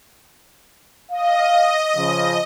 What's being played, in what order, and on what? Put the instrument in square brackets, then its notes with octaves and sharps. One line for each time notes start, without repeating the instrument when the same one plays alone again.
[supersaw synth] D#5 [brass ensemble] F5
[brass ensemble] C#3 F3